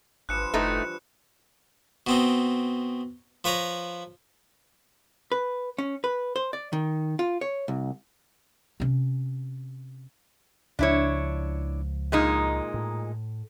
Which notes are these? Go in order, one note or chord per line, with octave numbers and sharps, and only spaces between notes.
G#1 G2 E3 F3 F#6 C#7 E7
F#1 A2 A3 D#4
B2 C4 D#4
F3 B4 C#5 A#5
B4
C#4
B4
C5
D5
D#3
F4
C#5
C2
C3 C#4
C#2 F3 D4 E4 C#5
A#2 G#3 D#4
A2